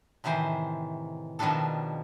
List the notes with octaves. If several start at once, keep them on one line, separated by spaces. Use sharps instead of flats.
A2 C3 D#3 E3 C5
B2 D#3 F3 G3 D4 A4